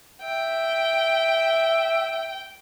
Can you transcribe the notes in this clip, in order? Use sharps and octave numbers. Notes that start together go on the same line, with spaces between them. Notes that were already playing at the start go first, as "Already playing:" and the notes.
E5 G5